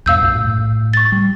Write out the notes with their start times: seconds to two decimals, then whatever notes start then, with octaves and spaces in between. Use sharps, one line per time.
0.06 E2 G2 B2 F5 E6 G6
0.22 B1 F#2 A#2
0.34 A2
0.93 C#6 A6
1.12 G3